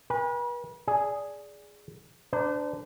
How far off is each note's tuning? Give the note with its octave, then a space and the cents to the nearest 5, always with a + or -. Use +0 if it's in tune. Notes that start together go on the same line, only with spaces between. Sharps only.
B4 -40 G#5 -45
G#4 +0 D5 -10 G#5 +0
D4 +0 C5 -40 A#5 +0